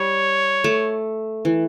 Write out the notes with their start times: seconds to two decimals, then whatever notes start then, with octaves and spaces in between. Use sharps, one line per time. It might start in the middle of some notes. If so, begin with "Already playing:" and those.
Already playing: G3 C#5
0.64 A3
1.45 E3